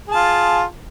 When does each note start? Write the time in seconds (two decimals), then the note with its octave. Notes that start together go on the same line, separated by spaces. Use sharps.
0.08 G#4
0.12 A5
0.15 F4